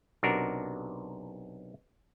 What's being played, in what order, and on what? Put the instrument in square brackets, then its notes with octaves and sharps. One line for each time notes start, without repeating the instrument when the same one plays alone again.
[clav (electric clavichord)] B1 C3 D4 F#4 A#4